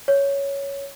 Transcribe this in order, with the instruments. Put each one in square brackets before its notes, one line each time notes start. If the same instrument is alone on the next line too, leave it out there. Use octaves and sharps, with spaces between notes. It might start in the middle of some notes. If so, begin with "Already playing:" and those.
[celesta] C#5